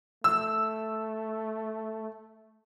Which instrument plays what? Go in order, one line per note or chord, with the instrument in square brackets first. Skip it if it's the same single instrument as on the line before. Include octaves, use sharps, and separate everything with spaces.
[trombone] A3 [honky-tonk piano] E6